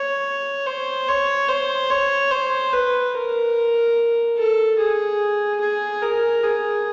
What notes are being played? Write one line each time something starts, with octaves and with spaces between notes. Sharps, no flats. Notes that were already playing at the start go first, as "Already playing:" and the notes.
Already playing: C#5
C5
C#5
C5
C#5
C5
B4
A#4
A4
G#4
G#4
A#4
G#4